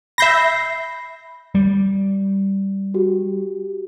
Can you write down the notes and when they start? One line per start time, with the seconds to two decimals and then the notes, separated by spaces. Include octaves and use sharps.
0.18 E5 B5 G6 A#6 C7
1.55 G3
2.94 F#4 G4